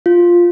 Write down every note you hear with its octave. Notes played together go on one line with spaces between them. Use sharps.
F4